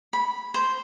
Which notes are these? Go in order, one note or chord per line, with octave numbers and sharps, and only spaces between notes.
B5
C5